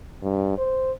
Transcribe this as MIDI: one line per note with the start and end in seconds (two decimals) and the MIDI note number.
0.23 0.54 43
0.58 0.92 72